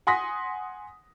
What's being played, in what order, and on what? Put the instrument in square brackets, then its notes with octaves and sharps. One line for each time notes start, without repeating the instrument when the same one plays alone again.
[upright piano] F#5 G#5 C6 D#6 A#6 B6